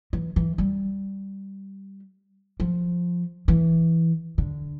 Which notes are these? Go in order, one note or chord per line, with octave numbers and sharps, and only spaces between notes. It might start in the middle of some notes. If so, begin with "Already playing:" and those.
E3
E3
G3
F3
E3
D3